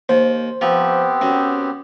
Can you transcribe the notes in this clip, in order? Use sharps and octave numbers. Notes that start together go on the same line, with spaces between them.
D#2 C5
F3 B3 C4 G4
F#2